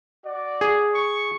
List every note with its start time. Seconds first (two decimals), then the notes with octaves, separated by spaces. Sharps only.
0.24 F#4 D5
0.61 G#4
0.94 C#6